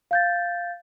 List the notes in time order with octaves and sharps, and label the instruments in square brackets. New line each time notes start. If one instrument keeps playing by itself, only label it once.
[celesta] F5 G6 A6